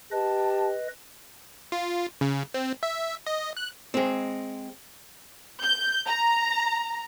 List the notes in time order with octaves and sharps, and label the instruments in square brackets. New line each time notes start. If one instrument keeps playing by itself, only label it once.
[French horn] G4 [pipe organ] B4 D#5 [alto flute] A5
[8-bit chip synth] F4
C#3
C4
E5
D#5
F#6
[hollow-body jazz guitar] G#3 C4
[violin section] G6
A#5